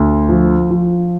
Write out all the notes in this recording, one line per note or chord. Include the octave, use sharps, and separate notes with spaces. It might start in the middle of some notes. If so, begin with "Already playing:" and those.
Already playing: D2
F3
F3